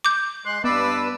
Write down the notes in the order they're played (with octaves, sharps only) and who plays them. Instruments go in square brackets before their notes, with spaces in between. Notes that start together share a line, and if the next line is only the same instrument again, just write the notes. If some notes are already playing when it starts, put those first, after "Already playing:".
[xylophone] D6 G6
[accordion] G#3 F#6 [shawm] C6
[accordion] G2 B4 E6 [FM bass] B3 [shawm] D5